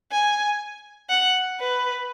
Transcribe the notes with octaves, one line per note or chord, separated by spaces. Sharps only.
G#5
F#5
B4